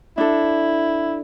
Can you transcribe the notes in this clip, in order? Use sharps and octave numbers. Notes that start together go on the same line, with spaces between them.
D4 E4 A4